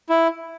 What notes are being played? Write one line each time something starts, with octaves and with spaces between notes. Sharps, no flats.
E4